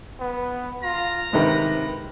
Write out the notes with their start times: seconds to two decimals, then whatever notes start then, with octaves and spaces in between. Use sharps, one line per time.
0.20 B3
0.83 F4 A#5
1.33 G#2 C3 D#3 B4